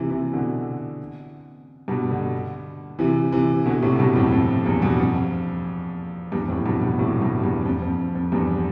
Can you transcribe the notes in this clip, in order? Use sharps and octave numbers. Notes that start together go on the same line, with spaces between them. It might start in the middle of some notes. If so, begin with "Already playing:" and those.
Already playing: C3 E3
C3 E3
B2 D3
G2 B2
B2 D3
C3 E3
C3 E3
B2 D3
A2 C3
G2 B2
F2 A2
F2
E2 G2
G2 B2
F2
E2 G2
F2 A2
G2 B2
G2 B2
A2 C3
G2 B2
E2 G2
F2
F2
F2
E2 G2